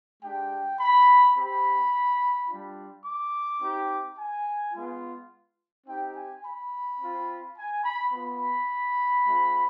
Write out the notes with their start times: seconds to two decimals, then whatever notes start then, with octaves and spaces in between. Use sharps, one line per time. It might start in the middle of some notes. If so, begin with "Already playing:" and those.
0.23 G#3 D4 G4 G5
0.80 B5
1.36 C4 G4 B5
2.49 G3 D4 F4
3.06 D6
3.62 C4 D#4 G4
4.18 G#5
4.74 G#3 B3 F4
5.87 C4 D#4 G4 G5
6.16 G#5
6.45 B5
7.00 C4 F4
7.57 G#5
7.84 B5
8.13 B3 F4 B5
9.26 G#3 C4 F4